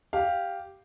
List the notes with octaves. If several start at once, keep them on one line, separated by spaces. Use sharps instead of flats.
G4 F5